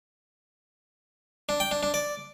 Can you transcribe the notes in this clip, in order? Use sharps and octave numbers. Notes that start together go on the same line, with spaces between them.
D4
G5
D4
D4
D5